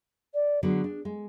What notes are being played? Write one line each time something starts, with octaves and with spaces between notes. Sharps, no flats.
D5
D3 F#3 B3 G#4
D4
G#3